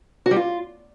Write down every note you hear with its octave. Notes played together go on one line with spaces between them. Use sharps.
F#4
G3
F4